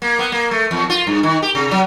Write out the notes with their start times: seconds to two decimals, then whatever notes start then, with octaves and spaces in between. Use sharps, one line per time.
0.02 A#3
0.19 B3
0.32 A#3
0.51 A3
0.71 E2
0.90 F4
1.07 G2
1.23 D#3
1.42 G4
1.55 C3
1.72 F#3